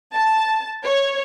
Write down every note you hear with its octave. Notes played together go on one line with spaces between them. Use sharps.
A5
C#5